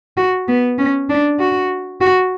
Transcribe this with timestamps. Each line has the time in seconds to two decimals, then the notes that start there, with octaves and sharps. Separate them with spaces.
0.17 F#4
0.48 B3
0.78 C#4
1.09 D4
1.39 F#4
2.01 F#4